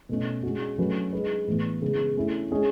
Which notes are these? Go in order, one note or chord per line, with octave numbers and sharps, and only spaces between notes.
B2 A3 C#4
G#3 C#4 F#4
F#3 A3 C#4 F#4 B4
G#3 D#4 G#4 B4
A2 E3 B3
C#3 G#3 B3
A3 C#4 E4
G#3 C#4 G#4